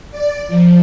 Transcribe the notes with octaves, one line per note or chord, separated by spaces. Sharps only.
D5
F3